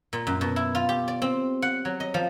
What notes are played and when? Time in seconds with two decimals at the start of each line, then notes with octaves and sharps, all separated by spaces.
0.13 A#2
0.27 F#2
0.41 B2
0.56 E4
0.75 F4
0.89 G4
1.08 D5
1.22 C4
1.62 F#5
1.85 F#3
2.00 D#5
2.14 F3